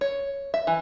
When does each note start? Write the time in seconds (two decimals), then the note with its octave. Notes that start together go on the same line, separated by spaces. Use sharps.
0.01 C#5
0.54 E5
0.67 E3